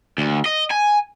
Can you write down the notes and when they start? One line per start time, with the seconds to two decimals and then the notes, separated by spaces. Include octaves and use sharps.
0.18 D2
0.45 D#5
0.71 G#5